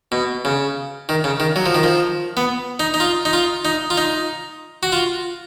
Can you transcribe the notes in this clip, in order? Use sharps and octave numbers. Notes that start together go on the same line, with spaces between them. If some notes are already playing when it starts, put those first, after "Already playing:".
B2
C#3
D#3
C#3
D#3
F#3
F3
D#3
F3
B3
D#4
D#4
F4
D#4
F4
D#4
F4
D#4
F#4
F4